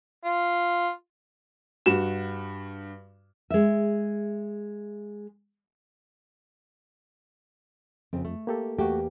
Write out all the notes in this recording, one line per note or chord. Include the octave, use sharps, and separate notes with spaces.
F4
G2 F#4 E7
G#3 E5
F2 C#3 C4
A3
A#3 G4 A4
E2 A3 A#3 F#4 G4